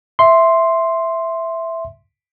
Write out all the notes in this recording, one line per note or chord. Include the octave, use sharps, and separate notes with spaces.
E5 C6